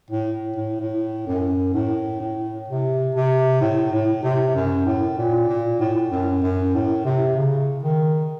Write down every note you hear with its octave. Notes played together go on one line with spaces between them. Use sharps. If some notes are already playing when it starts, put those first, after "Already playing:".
A2
A2
A2
F#2
A2
A2
C3
C3
A2
A2
C3
F#2
A2
A#2
A#2
A2
F#2
F#2
A2
C3
C#3
D#3